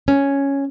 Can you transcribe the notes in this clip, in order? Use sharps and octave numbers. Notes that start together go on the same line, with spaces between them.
C#4